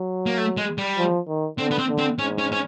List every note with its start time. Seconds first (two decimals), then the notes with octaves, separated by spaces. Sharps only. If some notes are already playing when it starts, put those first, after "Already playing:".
Already playing: F#3
0.26 A#3
0.38 A3
0.57 G#3
0.78 G3
0.98 F3
1.28 D#3
1.58 D3 C4
1.71 B3
1.78 C4
1.89 D3
1.99 C4
2.18 G#2 C#4
2.39 C#4
2.52 C#4